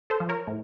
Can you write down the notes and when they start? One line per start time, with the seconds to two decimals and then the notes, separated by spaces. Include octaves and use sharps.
0.10 A4 C5
0.20 F3
0.29 A#4 C#5
0.47 A2